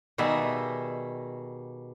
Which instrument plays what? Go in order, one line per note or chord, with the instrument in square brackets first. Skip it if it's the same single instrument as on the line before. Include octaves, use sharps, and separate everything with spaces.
[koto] B2 D#3 G3 G#4 E5